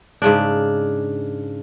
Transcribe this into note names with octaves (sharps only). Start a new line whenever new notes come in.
G#2 C#3 D4